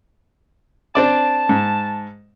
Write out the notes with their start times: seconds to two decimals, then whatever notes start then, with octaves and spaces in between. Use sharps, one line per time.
0.95 C4 D4 D5 A5
1.49 G#2